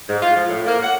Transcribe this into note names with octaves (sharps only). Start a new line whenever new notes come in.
G#2
F4
F3
A2
A#3
F#5